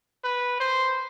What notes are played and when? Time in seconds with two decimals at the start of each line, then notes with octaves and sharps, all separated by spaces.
0.24 B4
0.60 C5